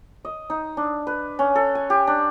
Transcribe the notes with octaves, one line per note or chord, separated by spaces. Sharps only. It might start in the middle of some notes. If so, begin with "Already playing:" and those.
D#5
D#4
D4
B4
C#4
A4
G#5
G4
D4